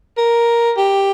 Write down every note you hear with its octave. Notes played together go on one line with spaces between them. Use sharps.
A#4
G4